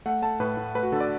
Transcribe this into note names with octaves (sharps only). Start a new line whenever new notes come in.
A3 F#5
A3 A5
A2 B4
A2
A3 B4
F#4
D3 A4
D5